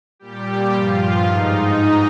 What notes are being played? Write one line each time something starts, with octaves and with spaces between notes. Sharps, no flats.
A#2 G3 G4
G2 F3 F4
G#2 D#4